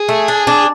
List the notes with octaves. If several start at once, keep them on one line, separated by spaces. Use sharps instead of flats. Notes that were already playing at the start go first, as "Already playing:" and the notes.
Already playing: G#4
A3
D4
D4